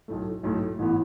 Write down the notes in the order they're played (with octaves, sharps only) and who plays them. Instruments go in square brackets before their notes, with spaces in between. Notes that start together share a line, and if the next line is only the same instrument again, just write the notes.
[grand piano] B1 A2 A3
B1 A2 A3
A1 A2 E3 B3 E4